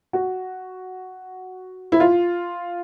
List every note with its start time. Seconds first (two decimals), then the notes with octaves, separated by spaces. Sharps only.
0.13 F#4
1.92 E4
2.00 F4